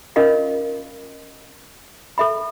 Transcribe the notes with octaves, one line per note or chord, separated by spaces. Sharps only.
C#4 F4 A#4 D#5 F5
A4 E5 B5